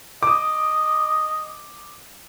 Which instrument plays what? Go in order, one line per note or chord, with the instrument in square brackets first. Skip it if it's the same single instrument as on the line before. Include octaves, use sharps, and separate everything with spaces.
[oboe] D#5 [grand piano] D6 D#6